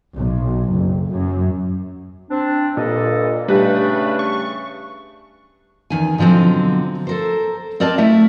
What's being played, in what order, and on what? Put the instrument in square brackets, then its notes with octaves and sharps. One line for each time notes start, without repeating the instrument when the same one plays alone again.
[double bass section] B1
F#1
F#2
[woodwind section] C4 D4
[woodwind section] G2 A4 D#5 [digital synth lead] A#2
[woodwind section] C#3 A3 D4 [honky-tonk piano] G3 [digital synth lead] B4
[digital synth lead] C#6
[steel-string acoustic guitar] E2 D#3 G#5
B2 D3 F3 F#3 C4
A4 A#4 C5
C4 A#4 D5 D#5 A5
A3 E4 E5